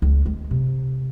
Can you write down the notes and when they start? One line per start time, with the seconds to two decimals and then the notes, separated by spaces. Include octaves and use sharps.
0.02 C#2
0.26 G#3
0.51 C3